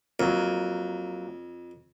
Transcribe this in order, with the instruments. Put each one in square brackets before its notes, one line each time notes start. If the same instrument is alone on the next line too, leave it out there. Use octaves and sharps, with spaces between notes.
[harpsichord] F2 [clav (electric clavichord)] F#3 A#3